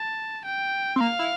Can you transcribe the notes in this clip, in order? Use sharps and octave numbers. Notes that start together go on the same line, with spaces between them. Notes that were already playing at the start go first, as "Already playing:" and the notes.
Already playing: A5
G5
C4
A#3 F5
E4